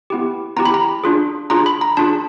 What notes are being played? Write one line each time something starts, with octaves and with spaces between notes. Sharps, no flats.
B3 E4 G4
B3 E4 G4 A#5
B5
A#5
D4 F4 G#4
D4 F4 G#4 A#5
B5
A#5
D4 F4 G#4 A5